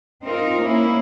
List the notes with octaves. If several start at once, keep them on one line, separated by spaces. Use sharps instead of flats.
C4 D#4 F4 A#4
A#3 C#4 E4